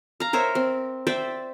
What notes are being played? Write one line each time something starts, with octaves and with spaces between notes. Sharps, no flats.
F5 A#5
A#4 C5 C#5 E5
C4
C5 D5 E5 G5